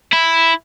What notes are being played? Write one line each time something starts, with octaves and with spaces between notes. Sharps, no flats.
E4